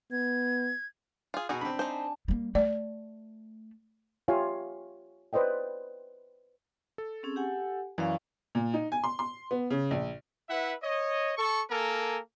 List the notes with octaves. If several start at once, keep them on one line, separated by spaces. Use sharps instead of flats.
B3 G#6
F4 G#4
B2 D#4 F#4 G#4
C4 D4 B5
D#4 C5 G#5 A5
G3 A#3
A3 D5
F4 G4 C#5 E5 F5 G#5
B4 C5 D5 D#5 G5
A4
C4 C#4 G#4
G4 F#5 G#5
F#2 E3 D5 F5 C#6
A#2
D#4
G#5
C6
C6
B3
C#3
A#1
E4 B4 E5 F#5
C#5 D#5
A4 C#6
A#3 A4 A#4 G#5